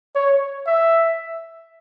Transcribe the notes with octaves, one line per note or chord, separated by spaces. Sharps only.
C#5
E5